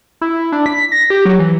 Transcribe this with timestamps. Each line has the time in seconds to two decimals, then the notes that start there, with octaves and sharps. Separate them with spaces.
0.21 E4
0.52 D4
0.66 B6
0.92 A#6
1.10 G4
1.25 F#3
1.39 E3